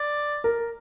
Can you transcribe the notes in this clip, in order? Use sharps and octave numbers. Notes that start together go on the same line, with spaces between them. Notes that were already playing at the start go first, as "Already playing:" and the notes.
Already playing: D5
A#4